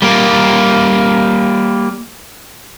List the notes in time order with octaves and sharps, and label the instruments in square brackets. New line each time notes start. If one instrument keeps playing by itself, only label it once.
[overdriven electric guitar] G3 A#3